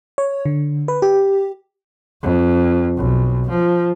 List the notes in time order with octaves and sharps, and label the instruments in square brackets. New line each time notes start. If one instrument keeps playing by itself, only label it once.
[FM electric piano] C#5
D3
B4
G4
[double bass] F2
B1
F3